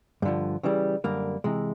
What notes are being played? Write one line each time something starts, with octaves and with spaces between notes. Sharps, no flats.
G2 D3 F3
C#3 E3 G3
F#2 D3 G3 A#3
C3 E3 G#3